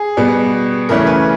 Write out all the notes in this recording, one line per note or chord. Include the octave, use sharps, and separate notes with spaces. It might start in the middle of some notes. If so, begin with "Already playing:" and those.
Already playing: G#4
B2 G3 B3
C#3 E3 A3 C#4 A#4
B4